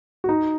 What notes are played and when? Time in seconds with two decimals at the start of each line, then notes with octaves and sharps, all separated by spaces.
0.24 F#4
0.29 D#4